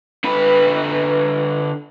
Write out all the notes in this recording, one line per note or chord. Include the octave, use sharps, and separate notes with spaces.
D3 B4